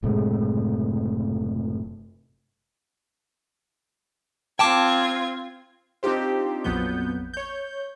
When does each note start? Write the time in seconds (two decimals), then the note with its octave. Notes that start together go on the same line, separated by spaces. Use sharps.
0.03 F#1 A2 C3 G#3
4.59 C4 F4 G5 A5 D6 G#6
6.03 C4 D4 D#4 F4 G4 C5
6.64 A#1 F2 F#3 B3 G6
7.34 C#5 G6